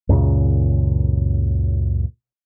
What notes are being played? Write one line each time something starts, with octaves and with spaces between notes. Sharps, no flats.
C#2 F#2 A#2 C#3